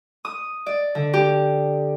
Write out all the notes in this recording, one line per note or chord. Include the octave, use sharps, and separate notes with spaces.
D#6
D5
D3
G4